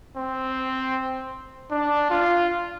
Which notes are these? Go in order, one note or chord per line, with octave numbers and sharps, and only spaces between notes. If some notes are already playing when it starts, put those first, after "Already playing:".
C4
D4
F4